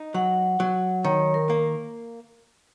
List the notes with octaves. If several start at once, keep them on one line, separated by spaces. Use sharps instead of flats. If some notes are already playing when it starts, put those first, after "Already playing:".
Already playing: D#4
F#3 F#5
F#3
D#3 C#5
A#4
A#3